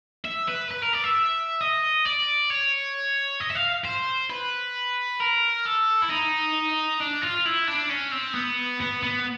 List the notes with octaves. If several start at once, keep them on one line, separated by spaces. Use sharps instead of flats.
E5
B4
B4
A#4
D5
E5
D#5
D5
C#5
D#5
E5
F5
C5
B4
A#4
A4
E4
D#4
D4
F4
E4
D4
C#4
C4
B3
B3
B3